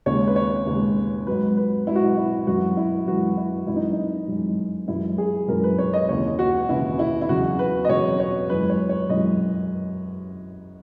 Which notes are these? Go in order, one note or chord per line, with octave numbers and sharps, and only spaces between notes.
D#2 C#3 G#3 C#5
B4
C#5
D#2 C#3 G#3
G#2 F#3 B4
B4
G#2 F#3 E4 F#4
E4
E4
F#2 E3 G#3 F#4
E4
F#2 E3 G#3 F#4
E4
F#2 E3 G#3 E4
D#4
D#4
F#2 E3 G#3
F#2 E3 G#3 E4
G#4
F#2 E3 G#3 A#4
B4
C#5
D#5
D#2 C#3 E3 C#5
F#4
D#2 C#3 E3 E4
E4
E4
E2 C#3 F#3 F#4
B4
D#5
E2 C#3 F#3 C#5
C#5
F#2 E3 G#3 B4
C#5
C#5
F#2 E3 G#3 D#5